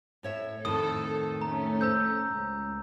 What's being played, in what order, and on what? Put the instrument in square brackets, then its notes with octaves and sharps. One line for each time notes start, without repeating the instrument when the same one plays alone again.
[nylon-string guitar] A2 C#5 E5
[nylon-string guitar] F2 A2 D#3 [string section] A4 [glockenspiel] D#6
[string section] A3 C#4 [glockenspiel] A#5
[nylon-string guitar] C5 [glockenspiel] A#5 E6 G6
[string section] C#2